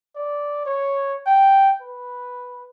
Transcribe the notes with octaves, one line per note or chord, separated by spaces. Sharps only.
D5
C#5
G5
B4